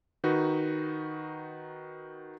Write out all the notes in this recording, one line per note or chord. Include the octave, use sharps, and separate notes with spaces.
D#3 D#4 F#4 B4